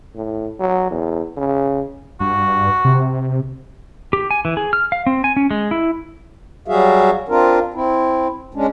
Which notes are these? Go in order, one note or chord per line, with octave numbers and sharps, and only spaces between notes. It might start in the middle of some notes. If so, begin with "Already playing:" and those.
A2
F#3
E2
C#3
G2 F#4
C3
G4
G#5
E3
G#4
F6
F5
C4
G#5
C#4
G#3
E4
F#3 G3 F#4 G#4 E5 F5
C4 D4 F4 A#4
C4 E4
G#3 C#4 D4